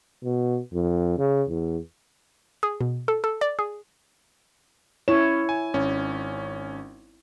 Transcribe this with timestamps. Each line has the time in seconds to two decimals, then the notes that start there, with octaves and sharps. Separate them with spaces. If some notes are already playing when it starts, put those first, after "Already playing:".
0.24 B2
0.74 F2
1.19 C#3
1.49 E2
2.63 G#4
2.81 B2
3.08 A4
3.24 A4
3.41 D5
3.59 G#4
5.08 C#4 E4 C#5 E7
5.49 G#5
5.74 G#1 C#4